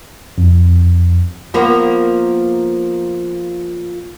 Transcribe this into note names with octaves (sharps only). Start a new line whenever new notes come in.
F2
F3 A#3 B3